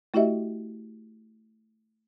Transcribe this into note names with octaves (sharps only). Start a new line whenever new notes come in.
A3 E4 F#4 G4 D#5 E5